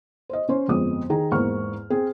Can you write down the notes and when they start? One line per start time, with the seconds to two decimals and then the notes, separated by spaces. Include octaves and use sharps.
0.29 C5 D#5
0.49 C#4 C5
0.68 G1 F2 G#3 D#6
1.10 D#3 G#4 A#5
1.32 E2 G#2 A#3 C#6 F6
1.90 C4 G#4